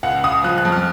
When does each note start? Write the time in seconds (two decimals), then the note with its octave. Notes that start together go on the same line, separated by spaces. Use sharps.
0.03 C#2 F#5
0.24 C#2 D#6
0.44 F3 F#6
0.58 F#6
0.65 F2
0.72 F6